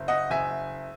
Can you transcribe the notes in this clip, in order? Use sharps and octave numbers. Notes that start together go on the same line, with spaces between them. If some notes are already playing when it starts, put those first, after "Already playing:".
Already playing: F#1
D#5 F#5
F#1 E5 G#5